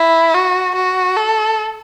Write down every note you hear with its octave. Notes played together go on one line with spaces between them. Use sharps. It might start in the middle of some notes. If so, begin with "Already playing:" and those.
Already playing: E4
F#4
F#4
A4